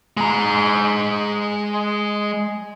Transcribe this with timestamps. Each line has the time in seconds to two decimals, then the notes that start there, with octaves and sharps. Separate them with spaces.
0.17 G#3 A#5